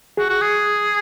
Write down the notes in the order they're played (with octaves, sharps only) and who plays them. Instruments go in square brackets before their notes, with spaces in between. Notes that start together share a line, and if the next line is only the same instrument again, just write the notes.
[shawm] F#4 [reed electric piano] G#4
[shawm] F#4
G#4